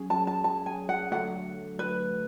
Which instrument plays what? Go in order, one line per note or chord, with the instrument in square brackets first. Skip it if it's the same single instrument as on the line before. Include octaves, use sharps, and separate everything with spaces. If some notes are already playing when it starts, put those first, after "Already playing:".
Already playing: [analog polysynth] F#3 C#4 G#4
[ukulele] A5
A5
A5
G#5
F#5
[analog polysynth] D3 F#3 A3 [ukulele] F#5
[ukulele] B4